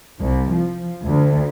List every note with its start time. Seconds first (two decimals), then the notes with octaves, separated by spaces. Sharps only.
0.20 C2
0.50 F3
1.04 D2